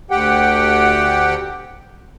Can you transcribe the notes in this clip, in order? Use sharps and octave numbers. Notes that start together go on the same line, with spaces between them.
D2 G4 F#5 G5